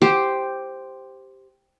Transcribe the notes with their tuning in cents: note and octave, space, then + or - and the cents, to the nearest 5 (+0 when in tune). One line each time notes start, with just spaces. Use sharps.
G4 +0 C5 +0